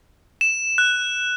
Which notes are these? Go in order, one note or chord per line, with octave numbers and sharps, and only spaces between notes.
E7
F#6